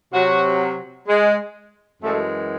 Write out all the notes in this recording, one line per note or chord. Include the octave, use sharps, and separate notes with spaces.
C3 F#3 F#4
G#3
F#2 E3 G#3 A3